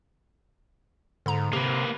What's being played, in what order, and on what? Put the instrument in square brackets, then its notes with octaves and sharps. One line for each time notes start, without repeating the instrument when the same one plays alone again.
[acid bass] G#2 [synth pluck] D3 A#5
[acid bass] C3 [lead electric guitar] A#3 B4 [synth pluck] G4